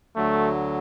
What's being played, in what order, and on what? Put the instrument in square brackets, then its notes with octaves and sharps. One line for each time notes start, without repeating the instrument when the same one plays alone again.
[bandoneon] D2 D3 F#3 [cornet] A3